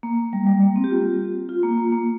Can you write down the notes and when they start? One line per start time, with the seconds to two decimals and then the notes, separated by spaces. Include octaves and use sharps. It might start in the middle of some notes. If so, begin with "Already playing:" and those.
0.03 A#3
0.33 G3
0.47 G3
0.61 A#3
0.76 C4
0.84 G4
0.90 F4
1.49 F4
1.63 A#3
1.78 A#3
1.92 A#3